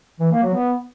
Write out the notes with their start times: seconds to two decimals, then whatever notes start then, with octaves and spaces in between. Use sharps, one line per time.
0.20 E3
0.31 A#3
0.42 F#3
0.54 B3